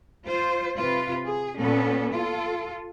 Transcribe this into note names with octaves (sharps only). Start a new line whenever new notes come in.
F4 C5
C3 F4 B4
G#4
A#2 B3 C#4 A4
F4 A4